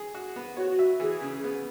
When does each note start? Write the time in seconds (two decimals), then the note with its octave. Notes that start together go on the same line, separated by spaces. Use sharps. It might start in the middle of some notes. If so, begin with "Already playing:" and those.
Already playing: G#4
0.14 F#4
0.36 B3
0.57 F#4 C#5
0.79 E5
1.00 E3 G#4
1.22 C#3
1.44 B3